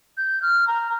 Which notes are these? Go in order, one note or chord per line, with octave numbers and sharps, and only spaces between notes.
G6
F6
A#5